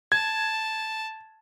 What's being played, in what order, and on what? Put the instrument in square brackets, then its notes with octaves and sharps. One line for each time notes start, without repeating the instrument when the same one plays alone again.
[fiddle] A5 [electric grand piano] G#6